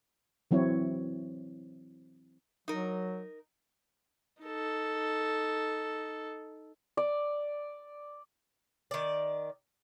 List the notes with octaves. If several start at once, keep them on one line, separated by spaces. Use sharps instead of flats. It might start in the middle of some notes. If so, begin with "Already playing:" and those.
E3 F#3 C4 E4 C#5
F#3 D#4 A#4
D#4 A4
D5
D#3 D5